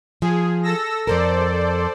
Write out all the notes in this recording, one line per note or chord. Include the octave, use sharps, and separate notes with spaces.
F3 G#4
A4 E6 A#6
F2 A#2 A4 A#4 C5 D5